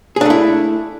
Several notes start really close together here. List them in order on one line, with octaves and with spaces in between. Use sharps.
G#4 D4 A3 E4